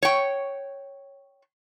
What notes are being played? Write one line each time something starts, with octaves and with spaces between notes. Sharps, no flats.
C#5 G5